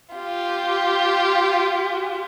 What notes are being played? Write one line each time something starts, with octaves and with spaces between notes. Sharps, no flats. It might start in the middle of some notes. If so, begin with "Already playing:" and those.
F4 G4